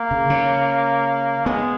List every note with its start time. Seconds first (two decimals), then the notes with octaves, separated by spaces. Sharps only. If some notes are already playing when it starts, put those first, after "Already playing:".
Already playing: A#3
0.11 C#3
0.30 C#3
1.46 G#3 B3